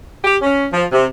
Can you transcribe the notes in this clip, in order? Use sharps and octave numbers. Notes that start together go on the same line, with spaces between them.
G4
C#4
F3
C3